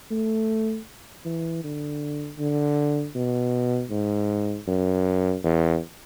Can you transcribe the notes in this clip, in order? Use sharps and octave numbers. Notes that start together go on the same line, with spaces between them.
A3
E3
D3
D3
B2
G#2
F#2
E2